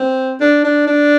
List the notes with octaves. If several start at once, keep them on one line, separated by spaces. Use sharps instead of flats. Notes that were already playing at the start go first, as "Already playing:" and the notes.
Already playing: C4
D4
D4
D4